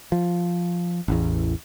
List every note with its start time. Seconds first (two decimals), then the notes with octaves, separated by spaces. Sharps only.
0.12 F3
1.08 A1 E2